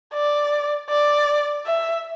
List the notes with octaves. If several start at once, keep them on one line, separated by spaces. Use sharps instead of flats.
D5
D5
E5